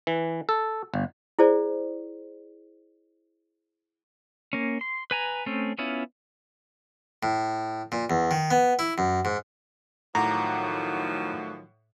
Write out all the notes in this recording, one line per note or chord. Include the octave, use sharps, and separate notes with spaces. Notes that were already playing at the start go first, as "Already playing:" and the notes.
E3
A4
G1
E4 G#4 C5 D5
A#3 C#4
C6
B4 G#5 A#5
A3 C4 C#4
B3 C#4 E4 F4
A2
A#2
E2
D#3
B3
E4
F#2
G#2
A2 D#3 F3 F#3 F#5 A#5 D6